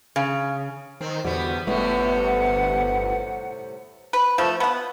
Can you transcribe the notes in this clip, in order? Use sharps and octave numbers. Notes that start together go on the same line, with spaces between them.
C#3
D#3 C4
E2 D3 G3 B3 F#4
G1 A2 C3 G3 A3 B3 F#5
B4
F3 A3
B3 F#5